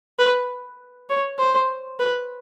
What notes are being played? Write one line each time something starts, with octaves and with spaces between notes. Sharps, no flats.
B4
C#5
C5
B4